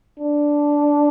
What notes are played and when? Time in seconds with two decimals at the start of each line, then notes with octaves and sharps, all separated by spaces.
0.19 D4